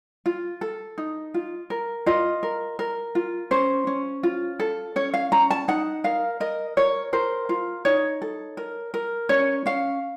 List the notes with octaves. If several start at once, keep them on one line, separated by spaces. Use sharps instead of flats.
F4
A4
D#4
F4
A#4
F4 D#5
A#4
A#4
F4
C#4 C5
C#4
F4
A4
C#4 C#5
F5
C#4 A#5
A5
D#4 F#5
A#4 F5
A#4 D#5
A#4 C#5
A#4 C5
F4
D#4 C#5
A4
A#4
A#4
C#4 C#5
C#4 F5